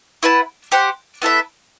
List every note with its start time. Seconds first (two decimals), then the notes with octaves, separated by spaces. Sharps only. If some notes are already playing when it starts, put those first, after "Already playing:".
0.23 E4 B4 F#5 A5
0.72 G4 C5 F#5
1.22 B3 E4 A4 E5